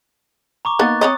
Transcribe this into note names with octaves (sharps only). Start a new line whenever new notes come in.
A#5 C#6 D6
A#3 B3 D#4 F#6 A6
C4 C#5 D#5 D#6